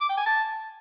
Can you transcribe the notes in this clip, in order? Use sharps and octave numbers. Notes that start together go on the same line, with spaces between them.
D6
G5
G#5
A5